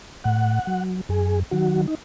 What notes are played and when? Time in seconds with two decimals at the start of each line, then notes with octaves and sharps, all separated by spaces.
0.24 A2 F#5
0.67 F#3
1.09 F#2 G#4
1.51 D#3 F#3 F#4
1.88 D#4